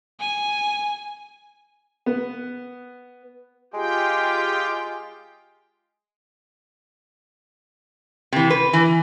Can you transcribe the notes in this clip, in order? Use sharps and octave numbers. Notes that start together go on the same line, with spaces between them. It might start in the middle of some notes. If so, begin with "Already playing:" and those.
G#5
B3
G#3 F4 G4 G5
C3 E3
B4
E3